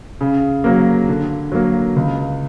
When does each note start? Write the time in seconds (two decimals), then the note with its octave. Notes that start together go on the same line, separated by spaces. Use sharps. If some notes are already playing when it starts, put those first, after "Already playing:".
0.21 C#3
0.64 F#3 A#3
1.09 D3
1.52 F#3 A#3
1.96 C#2